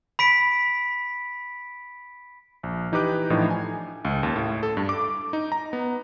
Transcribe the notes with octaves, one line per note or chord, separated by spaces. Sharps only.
B5 B6 D7
A#1
E3 D#4 G4 B4 D6 F#6
A2 E3 F3 D4 D#4
G#5
C#2
D#2
A2
A4
G2
D6
D#4
A#5
B3